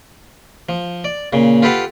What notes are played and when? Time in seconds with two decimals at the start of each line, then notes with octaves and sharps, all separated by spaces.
0.69 F3
1.04 D5
1.33 A#2 C#3
1.62 F4 G4 A4 B4 F5 F#5